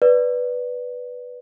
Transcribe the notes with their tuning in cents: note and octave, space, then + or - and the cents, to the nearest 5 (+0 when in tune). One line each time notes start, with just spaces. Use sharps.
B4 +0 D5 +0